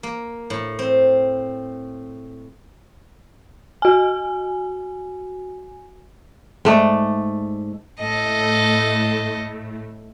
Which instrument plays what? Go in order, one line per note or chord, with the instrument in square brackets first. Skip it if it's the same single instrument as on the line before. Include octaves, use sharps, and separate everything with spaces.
[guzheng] A#3
A2
C4
[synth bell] F#4 G#5
[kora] G#2 A3 D5
[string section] A2 A3 [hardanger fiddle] A4 D#5